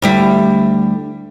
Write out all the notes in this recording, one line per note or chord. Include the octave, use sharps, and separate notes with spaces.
D2 G3 E4